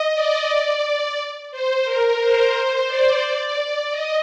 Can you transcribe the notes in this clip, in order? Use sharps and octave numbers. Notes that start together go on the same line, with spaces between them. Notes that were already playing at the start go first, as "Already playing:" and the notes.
Already playing: D#5
D5
C5
A#4
C5
D5
D5
D#5